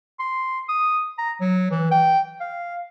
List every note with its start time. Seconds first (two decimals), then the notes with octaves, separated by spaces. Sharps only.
0.20 C6
0.69 D#6
1.18 A#5
1.41 F#3
1.71 E3
1.91 G5
2.40 F5